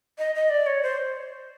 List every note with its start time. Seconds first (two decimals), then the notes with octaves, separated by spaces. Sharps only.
0.19 D#5
0.35 D#5
0.50 D5
0.67 C#5
0.83 C5